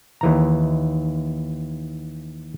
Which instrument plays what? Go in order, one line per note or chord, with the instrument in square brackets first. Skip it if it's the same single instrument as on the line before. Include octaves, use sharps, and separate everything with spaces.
[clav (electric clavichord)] D#2 E3 A#5